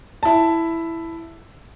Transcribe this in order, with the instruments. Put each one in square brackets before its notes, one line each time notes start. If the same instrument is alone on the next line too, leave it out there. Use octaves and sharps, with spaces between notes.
[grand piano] E4 A5